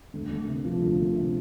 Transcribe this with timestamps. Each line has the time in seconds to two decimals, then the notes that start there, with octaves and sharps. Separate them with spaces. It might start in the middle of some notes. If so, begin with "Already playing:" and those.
0.13 D2
0.31 D2
0.48 C3
0.65 F3
0.82 D2
0.99 D2
1.16 C3